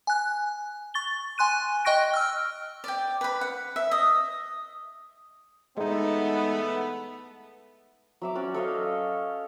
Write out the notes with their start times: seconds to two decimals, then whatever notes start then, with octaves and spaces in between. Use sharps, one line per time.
0.07 G#5 F#6
0.94 C#6 A6 G7
1.38 G#5 C6 F#6 D#7
1.85 D#5 G5 C#6 F#6 A#6 D7
2.14 E6 F6
2.84 D5 G5
3.21 B4 B5
3.41 F#5
3.76 E5
3.91 D#5
5.77 E2 G#3 A3 B3 D#4
8.22 F#3 E5 D6
8.35 C#4 F#4 D5
8.54 A4 C#5 D#5 F5